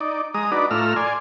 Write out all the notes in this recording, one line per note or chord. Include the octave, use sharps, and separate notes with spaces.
D#4 D5
G#3 A#5 D#6
D4 D#4 F#4 B4 D5
A2 A3 F4 A#5 E6 F6
D5 G#5 C6